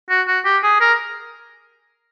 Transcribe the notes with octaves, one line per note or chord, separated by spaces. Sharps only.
F#4
F#4
G4
G#4
A#4